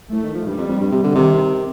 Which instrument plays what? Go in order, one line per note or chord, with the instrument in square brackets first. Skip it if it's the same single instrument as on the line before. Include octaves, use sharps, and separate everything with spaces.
[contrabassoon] A2 [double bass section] A3
[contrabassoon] D#3
F3
[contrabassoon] G2 [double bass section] G3
[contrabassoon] F2
F2
G2
C3
D3
[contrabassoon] C3 [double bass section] D#3